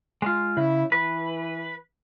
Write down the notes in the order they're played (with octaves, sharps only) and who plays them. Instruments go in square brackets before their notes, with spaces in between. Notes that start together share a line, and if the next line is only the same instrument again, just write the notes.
[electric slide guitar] G#3 F4
[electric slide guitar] C#3 [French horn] E4
[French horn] E3 [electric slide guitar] B4